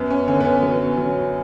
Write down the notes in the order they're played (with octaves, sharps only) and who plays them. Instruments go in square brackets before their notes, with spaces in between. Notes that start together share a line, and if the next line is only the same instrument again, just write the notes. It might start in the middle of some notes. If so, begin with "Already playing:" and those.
Already playing: [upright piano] F#2 [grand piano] B3
[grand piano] C#4
[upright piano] D3 [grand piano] C#4
[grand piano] B3
C#4
[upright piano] F#3 [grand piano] B3
[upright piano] F#3